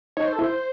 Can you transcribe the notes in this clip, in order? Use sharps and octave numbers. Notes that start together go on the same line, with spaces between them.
D#4 C#5 D#5
C5
A4
E4 C5 E5